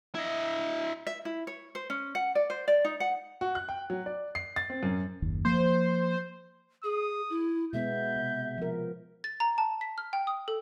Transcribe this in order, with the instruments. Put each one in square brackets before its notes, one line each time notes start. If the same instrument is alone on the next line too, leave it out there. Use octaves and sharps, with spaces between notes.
[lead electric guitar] E4 D#5
[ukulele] E5
E4
C#5
C5
C#4
F#5
D5
C5
D5
D#4
F#5
[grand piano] F#4
F#6
G5
F#3
D5
C7
A6
C4
F#2
[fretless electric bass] F#1 D#2
[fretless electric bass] F3 A#3 [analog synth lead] C5
[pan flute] G#4 [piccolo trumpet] D#6
[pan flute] E4
[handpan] B2 G#3 B3 [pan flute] E5 [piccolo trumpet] G6
[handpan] C3
F3 A#4
[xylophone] A6
A#5
A5
B6
F6
G5
D#6
A4